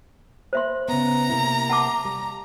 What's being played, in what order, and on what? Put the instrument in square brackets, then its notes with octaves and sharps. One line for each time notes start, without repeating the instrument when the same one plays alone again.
[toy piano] C5 E5 C6
[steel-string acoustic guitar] C#3 B3 [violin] A#5
[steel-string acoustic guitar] C3 A#3 E4
[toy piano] F#5 A5 D6
[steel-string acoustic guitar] G3